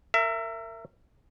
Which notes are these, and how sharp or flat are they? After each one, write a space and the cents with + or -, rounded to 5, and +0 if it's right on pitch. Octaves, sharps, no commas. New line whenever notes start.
A#4 -25 E5 +20